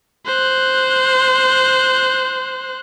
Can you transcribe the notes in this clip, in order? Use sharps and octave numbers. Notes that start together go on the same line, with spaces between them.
C5 F#6